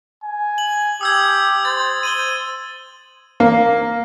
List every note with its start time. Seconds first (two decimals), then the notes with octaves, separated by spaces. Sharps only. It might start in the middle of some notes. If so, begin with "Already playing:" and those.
0.23 G#5
0.58 F#7
1.01 G4 D#6 E6 G#6
1.65 C5 A6
2.03 C5 D#7 F#7 G7
3.40 A#3